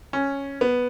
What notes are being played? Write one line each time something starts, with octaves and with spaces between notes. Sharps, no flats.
C#4
B3